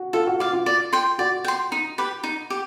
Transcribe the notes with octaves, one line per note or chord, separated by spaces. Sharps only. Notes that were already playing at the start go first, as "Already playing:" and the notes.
Already playing: F#4
F4 A4
F#4
F4 D5 F5
F4
D5
G5 C6
F#4 D5
G5 C6
D#4
G4 B4
D#4
G4